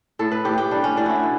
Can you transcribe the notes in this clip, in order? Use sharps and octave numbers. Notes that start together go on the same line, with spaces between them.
A2 A4
B4
A2 G4
G4
G3 D4
C#4
A2 D4
E4 F#4
B2